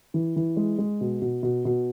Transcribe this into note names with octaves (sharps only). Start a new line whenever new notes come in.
E3
E3
G#3
G#3
B2
B2
B2
B2